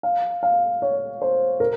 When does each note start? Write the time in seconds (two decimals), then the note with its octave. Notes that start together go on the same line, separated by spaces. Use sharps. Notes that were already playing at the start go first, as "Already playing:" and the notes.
0.03 F5
0.43 F5
0.82 C#5
1.22 C5
1.60 A#4